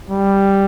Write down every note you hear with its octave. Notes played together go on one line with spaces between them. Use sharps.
G3